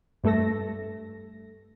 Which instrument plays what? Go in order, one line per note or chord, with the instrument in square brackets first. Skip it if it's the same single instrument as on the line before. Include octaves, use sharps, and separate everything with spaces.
[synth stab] G2 A3 A4 A#6